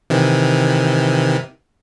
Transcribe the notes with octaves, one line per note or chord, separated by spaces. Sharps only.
C3 D#3 E3